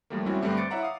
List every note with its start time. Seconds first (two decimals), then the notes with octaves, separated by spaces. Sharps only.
0.10 D#2 F3 G3 A3 A#3
0.26 G3 G#3 C4 C#4 E4 F#4
0.41 G2 D3 G3 A3 C4 G4
0.57 C5 D6 A6 C#7 D7
0.71 E4 C#5 E5 F#5 A#5
0.83 F5 D#6